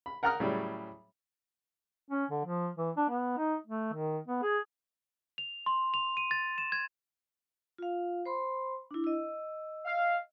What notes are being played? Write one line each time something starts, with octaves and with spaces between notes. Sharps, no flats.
B5
A#4 F#5 G5 A#5 D#6 F6
A2 C#3 F#3 G3
C#4
D3
F3
E3
D4
B3
D#4
A3
D#3
B3
G#4
F7
C6
F7
D#7
A6
E7
G#6
F4 F5
C5 B5 C6
D4 E4
D#5 E6
F5